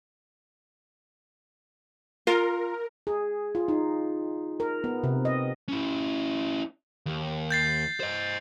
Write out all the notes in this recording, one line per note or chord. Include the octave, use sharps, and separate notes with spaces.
F4 A#4
G#4
F4
D#4
A#4
B3
C3
D#5
C#4 E4
D#2
G6 A6 C7
C5 D#5